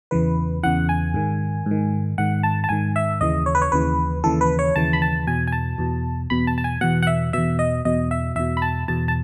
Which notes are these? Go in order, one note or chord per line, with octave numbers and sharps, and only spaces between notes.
E2 C#3 E3 B4
E2 C#3 E3 F#5
G#5
G#2 D#3
G#2
D#3
G#2 D#3 F#5
A5
A5
G#2 D#3 G#5
E5
D#2 C#3 E3 D#5
C#5
B4
C#5
D#2 C#3 E3 B4
D#2 C#3 E3 A4
B4
C#5
D#2 C#3 E3 A5
B5
A5
E2 B2 G#5
G#5
A5
E2 B2
E2 B2 B5
A5
A5
G#5
E2 B2 F#5
F#5
E5
E2 B2 E5
D#5
E2 B2 D#5
E5
E2 B2 E5
B5
A5
E2 B2 A5
A5